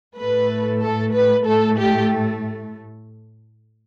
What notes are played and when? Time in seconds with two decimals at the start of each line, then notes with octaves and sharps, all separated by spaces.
0.16 A2 A3 B4
0.81 A4
1.14 B4
1.46 A2 A3 A4
1.79 G4